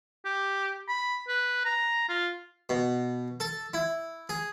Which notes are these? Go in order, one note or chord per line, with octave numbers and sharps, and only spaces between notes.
G4
B5
B4
A#5
F4
B2
A4
E4
G#4